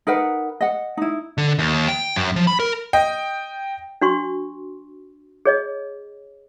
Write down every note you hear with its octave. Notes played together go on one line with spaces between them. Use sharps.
D#4 A#4 B4 F#5
D#5 F#5
D#4 E4
D3
D#2
G5
F#2
F3
B5
A#4
D#5 G5
D4 F#4 C6 C#6
G#4 C#5 D#5